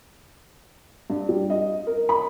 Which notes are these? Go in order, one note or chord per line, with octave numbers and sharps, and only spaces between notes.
G2
G3
D#5
A#4
B5